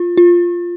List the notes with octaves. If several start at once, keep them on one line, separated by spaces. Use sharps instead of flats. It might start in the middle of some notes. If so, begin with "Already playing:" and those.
Already playing: F4
F4